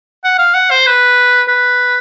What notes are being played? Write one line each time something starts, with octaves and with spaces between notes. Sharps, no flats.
F#5
F5
F#5
C5
B4
B4